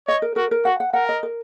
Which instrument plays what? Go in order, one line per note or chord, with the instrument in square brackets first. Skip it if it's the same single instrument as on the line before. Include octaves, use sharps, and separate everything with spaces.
[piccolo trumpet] C#5 [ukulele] D#5
[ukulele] A#4
[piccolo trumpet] F#4 [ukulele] A#4
[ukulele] A#4
[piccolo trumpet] F#4 [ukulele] F#5
[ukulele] F#5
[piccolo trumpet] A#4 [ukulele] F#5
[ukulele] D#5
A#4